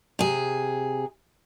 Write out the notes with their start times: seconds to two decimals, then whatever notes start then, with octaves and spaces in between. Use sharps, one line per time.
0.19 C3 G#4